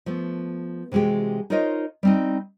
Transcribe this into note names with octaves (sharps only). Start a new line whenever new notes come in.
F3 A3 B3
C3 E3 G#3 F#4 G4
D#4 F4 A#4 C5 C#5 D#5
G3 C4 D#4